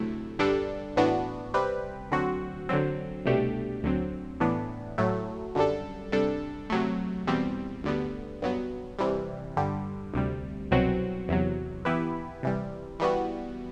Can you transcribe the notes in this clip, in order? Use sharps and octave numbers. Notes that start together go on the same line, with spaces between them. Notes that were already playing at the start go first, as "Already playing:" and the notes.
Already playing: D2 C3 F#3 A3 E4
G2 D3 G3 D4 A4
A2 E3 B3 D4 F#4
C3 G3 C4 G4 B4
D2 D3 F#3 C4 F#4
D3 F#3 C4
C2 B2 A3 D4 G4
D2 D3 F#3 C4
A2 E3 B3 D4
A2 F#3 A3
F#2 D3 G3 D4 A4
C3 G3 D4 A4
C3 F#3 A3
E2 B2 G3 C4
D2 D3 G3 B3
G2 F#3 B3
C3 E3 G3
G2 D3 G3
D2 C3 G3
C2 B2 F#3 C4 F#4
E2 C3 F#3
E3 B3 E4 G4 B4
C3 E3 G3
E3 G3 B3 F#4